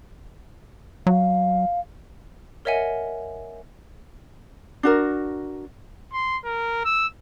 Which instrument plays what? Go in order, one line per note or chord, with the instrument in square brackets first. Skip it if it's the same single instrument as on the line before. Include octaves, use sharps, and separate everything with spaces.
[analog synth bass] F#3 [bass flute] F5
[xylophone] A#4 C#5 D#5 E5 F#5 G#5
[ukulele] D4 F#4 A#4
[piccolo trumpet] C6
A#4
E6